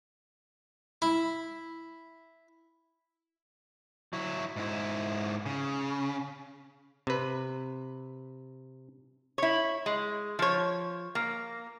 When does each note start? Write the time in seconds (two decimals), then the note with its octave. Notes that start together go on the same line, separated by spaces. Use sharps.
1.02 E4
4.13 F#3 E4
4.56 G#2 E4
5.46 C#3
7.07 C3 B4
9.38 E4 C#5
9.86 G#3
10.39 F3 C#5
11.15 A#3